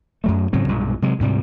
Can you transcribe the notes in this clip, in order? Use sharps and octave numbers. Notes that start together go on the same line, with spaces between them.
F#2 F#3 A3
G#2 C#3 F#3 C4
B1 G2 A#2 G#3
C3 F#3 G#3
D2 G#2 C3 G3